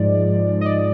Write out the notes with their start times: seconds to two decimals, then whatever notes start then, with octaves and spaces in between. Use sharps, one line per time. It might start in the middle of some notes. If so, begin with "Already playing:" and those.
Already playing: G#2 F3 G#3 D5
0.61 D#5
0.66 D5